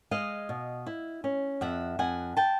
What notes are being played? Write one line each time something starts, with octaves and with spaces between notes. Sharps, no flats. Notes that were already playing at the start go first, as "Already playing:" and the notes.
G#3 D#5 F5
B2
E4
C#4
F2 E5 F#5
F2 F#5 G#5
G5 A5